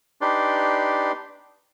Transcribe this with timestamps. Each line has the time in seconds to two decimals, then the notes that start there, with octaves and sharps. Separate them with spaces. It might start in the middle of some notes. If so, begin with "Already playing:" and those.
0.21 D4 D#4 G4 B4 D5 C6